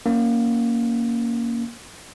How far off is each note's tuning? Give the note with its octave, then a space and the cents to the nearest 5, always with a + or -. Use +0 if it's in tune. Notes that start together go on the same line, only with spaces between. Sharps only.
A#3 +0 C#4 +10